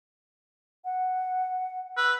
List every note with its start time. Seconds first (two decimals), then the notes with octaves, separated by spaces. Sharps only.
0.85 F#5
1.97 B4 E6